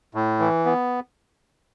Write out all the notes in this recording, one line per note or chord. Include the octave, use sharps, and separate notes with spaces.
A2
E3
B3